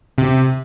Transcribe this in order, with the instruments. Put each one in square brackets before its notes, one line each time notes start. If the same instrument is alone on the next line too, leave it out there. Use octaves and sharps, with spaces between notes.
[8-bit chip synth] C3